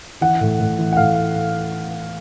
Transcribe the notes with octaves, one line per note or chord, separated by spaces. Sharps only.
E3 F#5
A2
A2
E3
F#5
A2 F5